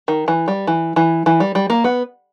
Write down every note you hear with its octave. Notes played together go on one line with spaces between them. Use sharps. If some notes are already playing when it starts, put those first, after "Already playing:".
D#3
E3
G3
E3
E3
E3
G3
G3
A#3
B3